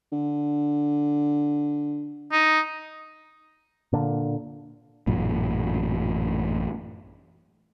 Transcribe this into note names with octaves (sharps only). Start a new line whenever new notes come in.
D3
D#4
A#2 D3
A1 F#2 A#2